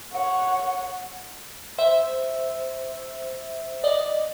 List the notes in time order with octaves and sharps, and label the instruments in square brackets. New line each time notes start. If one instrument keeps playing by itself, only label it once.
[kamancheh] C#5 F#5
[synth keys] C5 E5
D5 D#5